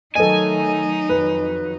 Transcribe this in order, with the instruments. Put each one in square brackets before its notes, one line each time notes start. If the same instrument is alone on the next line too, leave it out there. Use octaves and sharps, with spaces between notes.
[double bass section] D#3 F#3 A3 [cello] D#4 [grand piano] A4 D#5 [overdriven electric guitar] G#5
[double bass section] F2 D#3 F#3 [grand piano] B4